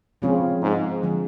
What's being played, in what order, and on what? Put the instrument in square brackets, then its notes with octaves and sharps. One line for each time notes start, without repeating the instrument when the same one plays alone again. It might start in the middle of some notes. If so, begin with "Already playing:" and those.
[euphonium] C#3 [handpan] F3 G#3 C4 F4 G#4
[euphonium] G#2
[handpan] D3 F3 G#3